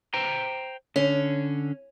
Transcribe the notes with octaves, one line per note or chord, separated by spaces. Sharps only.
C5 G5 A#5
D3 C#4